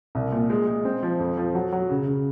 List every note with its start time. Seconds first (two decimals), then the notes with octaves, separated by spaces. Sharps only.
0.15 C2
0.32 A#2
0.50 G#3
0.67 G#3
0.85 C4
1.03 F3
1.20 F2
1.37 F3
1.55 F#3
1.72 F#3
1.89 C#3
2.08 C#3